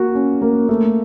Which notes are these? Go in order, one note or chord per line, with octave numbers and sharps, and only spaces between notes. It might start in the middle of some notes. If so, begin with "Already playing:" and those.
Already playing: A#3 F#4
C#4
A#3
A3